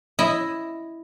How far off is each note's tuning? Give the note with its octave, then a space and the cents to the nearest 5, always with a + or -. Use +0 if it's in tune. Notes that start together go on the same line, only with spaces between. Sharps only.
E4 +0 D#5 +0